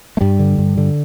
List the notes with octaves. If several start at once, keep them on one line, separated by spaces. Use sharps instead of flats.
A3
G2 G3
D3
G2
D3